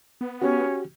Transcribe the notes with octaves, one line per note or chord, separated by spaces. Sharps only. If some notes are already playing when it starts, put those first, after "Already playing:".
B3
C#4 F#4 G4